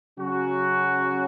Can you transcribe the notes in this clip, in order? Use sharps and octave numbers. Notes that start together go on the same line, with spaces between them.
C#3 F#3 C#4 F#4